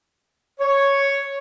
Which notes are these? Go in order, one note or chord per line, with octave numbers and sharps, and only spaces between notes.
C#5